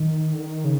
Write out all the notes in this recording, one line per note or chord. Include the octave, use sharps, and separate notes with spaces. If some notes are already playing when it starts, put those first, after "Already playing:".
Already playing: D#3
D3
D#3
C#3